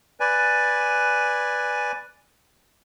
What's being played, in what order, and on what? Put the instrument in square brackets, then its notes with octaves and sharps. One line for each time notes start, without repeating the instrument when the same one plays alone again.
[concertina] B4 D5 G#5